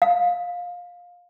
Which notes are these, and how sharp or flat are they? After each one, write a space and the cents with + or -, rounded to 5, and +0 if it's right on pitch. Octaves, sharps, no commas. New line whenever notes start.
F5 +20